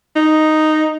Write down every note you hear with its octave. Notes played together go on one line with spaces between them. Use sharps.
D#4